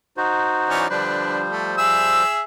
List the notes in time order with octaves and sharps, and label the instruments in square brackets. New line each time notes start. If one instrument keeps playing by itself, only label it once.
[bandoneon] D#4 F#4 C5
[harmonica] E3 C#4 D5
[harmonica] D3 D4 B4 [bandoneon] F3 G3 C5
[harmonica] A3
G#4 E5 E6